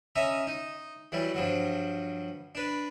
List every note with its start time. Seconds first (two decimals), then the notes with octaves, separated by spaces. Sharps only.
0.16 C#4 D#5 E5 A#5
0.47 D#4
1.12 E3 F#3 G3
1.34 G2 F3 F#3
2.55 D4 B4